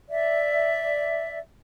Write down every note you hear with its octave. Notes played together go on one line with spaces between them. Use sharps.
D5 E5